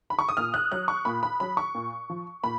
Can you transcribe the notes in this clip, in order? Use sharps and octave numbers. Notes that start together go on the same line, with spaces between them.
B5
C#6
D#6
A#2 F6
F#6
F#3 F#6
C#6
A#2 B5
B5
F#3 B5
C#6
A#2
F3
A#2 B5